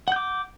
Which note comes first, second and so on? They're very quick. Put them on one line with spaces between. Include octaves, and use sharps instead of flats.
F#5 G6 D6